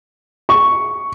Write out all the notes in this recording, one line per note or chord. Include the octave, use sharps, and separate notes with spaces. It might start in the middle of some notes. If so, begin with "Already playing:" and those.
C#6